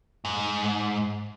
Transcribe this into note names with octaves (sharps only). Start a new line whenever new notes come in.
G#2